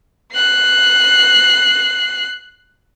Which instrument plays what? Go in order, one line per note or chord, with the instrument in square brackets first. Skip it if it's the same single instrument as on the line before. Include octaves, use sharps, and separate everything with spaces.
[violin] F#6 C7